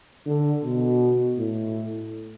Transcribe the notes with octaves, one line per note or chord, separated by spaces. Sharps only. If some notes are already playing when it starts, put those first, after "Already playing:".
D3
B2
A2